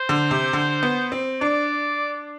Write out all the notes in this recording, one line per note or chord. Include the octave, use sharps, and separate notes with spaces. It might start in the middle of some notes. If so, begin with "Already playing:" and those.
Already playing: C5
D3
C3
D3
B3
C4
D4 D5